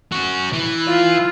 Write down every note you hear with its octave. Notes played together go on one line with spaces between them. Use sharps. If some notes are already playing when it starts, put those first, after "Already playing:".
C#4 F#4
E3
F4